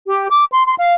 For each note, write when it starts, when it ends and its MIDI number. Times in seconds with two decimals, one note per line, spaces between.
0.07 0.27 67
0.30 0.45 86
0.52 0.66 84
0.66 0.75 84
0.79 0.94 77